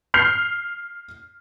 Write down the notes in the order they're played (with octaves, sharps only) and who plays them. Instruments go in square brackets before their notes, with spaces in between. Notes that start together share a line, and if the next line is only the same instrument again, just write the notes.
[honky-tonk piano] F6 G6 C7 F7